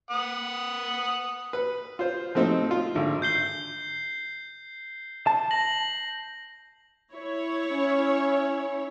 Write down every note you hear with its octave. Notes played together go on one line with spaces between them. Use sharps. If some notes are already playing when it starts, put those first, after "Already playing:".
F#5 D#6
B4
F4 C5
F3 A3 C4 D#4
F4
G#1 D3
G6 C7 G7
A5
A#6 F#7
E4 C#5
C#4